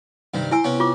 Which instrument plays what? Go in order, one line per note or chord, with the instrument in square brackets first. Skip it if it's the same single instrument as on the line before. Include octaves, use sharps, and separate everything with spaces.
[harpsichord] G2 C3 D#3
[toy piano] E4 G#5 E6 [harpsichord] C5
[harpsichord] C3 B3 C#4
[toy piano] F4 D6